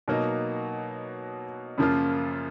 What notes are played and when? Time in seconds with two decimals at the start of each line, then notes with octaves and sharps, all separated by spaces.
0.08 B2 F#3 A#3 D#4
1.78 F#2 C#3 F3 A#3 F4